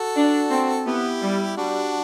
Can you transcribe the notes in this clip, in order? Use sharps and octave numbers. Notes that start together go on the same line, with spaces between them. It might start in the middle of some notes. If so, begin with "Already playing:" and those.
Already playing: F#4 A4
D4
C4
B3 E4 G4
G3
G3 D4 F#4